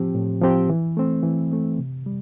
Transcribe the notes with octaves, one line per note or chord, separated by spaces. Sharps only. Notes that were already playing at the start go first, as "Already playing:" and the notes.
Already playing: A2 F3 C4 G4
A2
F3 C4 G4
E3
A3 C4
E3
A3 C4
C3
G3